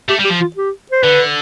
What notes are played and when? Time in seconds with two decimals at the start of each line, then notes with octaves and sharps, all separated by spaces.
0.09 A3 G4
0.20 G3
0.24 G4
0.30 F3
0.41 F4
0.56 G4
0.92 C5
1.03 D3 B4